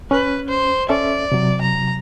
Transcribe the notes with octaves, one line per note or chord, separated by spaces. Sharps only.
C#4 B4
C5
C#4 A4 D5 E5
C3 F#3
A#5